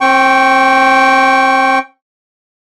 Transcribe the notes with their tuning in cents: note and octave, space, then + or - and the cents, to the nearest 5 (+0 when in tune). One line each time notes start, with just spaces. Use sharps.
C4 +35 G5 -5 C#6 +0